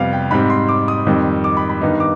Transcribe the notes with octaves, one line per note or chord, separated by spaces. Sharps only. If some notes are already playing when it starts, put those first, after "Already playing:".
Already playing: F2 C3 G3 B3 F5
G5
G#2 G3 C4 B5
C6
D6
D#6
F2 D#3 G3 C4
D6
B5
B5
G2 D#3 B3 D#4
D6